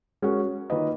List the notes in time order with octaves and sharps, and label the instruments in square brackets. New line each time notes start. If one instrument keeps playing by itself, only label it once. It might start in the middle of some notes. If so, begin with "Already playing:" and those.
[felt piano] G#3 C#4 F#4 A#4 C#5
D#3 A#3 F4 B4 D#5